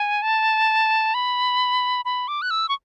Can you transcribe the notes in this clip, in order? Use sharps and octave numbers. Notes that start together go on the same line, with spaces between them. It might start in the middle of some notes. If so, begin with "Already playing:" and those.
Already playing: G#5
A5
B5
B5
D6
F#6
E6
C#6